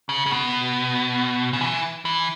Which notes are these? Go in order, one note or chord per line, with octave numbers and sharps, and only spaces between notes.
C#3
C#3
B2
C#3
E3
E3